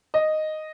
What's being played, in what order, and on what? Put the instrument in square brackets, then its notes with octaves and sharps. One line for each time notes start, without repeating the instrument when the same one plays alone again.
[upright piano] D#5